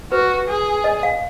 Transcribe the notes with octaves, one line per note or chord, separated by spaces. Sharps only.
F#4 B4
G#4
D#5
F5